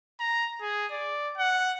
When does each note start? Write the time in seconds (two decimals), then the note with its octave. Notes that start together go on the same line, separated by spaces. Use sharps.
0.20 A#5
0.61 G#4
0.92 D5
1.37 F#5